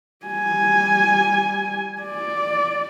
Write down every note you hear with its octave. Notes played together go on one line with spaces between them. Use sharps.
G3 G#5
D5